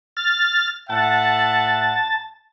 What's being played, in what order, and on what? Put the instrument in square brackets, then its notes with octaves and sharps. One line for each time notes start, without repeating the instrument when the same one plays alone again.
[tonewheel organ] F6 A6
[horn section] A2 E5 F#5 [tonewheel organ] A5